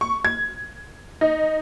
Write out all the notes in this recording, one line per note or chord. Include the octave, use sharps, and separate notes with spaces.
C#6
G#6
D#4